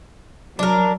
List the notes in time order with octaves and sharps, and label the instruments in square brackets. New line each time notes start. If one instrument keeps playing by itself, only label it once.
[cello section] F#3 [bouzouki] D4 A#4